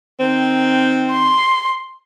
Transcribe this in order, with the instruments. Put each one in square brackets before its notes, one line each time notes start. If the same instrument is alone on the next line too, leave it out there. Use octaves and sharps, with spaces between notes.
[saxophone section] D#3 C4
[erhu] C6